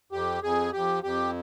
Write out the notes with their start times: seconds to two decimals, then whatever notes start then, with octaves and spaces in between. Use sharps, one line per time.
0.12 F2 G4
0.43 F2 G#4
0.73 F2 G4
1.03 F2 G4